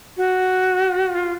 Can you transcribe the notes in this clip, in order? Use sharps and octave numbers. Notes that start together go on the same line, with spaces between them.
F#4
F4